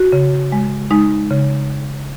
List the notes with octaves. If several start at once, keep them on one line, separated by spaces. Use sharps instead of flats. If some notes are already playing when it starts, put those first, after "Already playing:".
Already playing: F#4
C#3
G#3
G#3 D#4
C#3